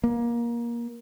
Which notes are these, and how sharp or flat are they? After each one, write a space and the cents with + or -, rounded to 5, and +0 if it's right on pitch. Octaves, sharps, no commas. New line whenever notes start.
A#3 +20